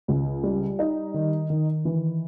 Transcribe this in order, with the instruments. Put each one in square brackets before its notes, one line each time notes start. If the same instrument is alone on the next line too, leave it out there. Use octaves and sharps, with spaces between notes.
[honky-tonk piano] C#2
G3
D#4
D#3
D#3
E3